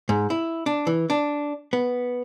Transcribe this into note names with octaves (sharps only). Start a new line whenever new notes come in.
G#2
E4
D4
E3
D4
B3